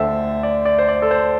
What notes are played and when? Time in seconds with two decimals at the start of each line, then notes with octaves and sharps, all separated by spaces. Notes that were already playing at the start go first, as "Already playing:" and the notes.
Already playing: D2 D3 A3 A4 C5 E5 G5
0.43 D5
0.65 D5
0.78 C5
0.89 D5
1.02 A4
1.11 C5